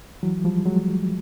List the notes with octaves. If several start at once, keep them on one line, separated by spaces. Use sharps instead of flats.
E3 F#3
F3 G3
F#3 G#3